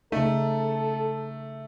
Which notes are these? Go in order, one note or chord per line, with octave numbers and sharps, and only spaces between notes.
C#3 A3 D#4 A4